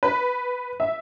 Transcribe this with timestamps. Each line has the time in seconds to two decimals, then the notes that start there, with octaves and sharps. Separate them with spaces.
0.03 B4
0.80 E5